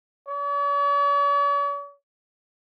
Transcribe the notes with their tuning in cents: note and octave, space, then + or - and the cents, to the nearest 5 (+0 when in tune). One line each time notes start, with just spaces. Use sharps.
C#5 +45